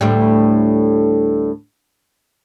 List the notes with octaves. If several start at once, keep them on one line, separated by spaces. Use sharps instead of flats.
D2 A2 G3